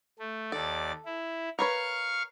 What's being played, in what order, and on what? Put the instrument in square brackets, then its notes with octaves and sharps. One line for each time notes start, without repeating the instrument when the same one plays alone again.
[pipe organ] A3
[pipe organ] D#2 D5 A6 [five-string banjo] A4
[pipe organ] E4
[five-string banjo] A#4 B4 C#5 [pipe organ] F5 C#6 F6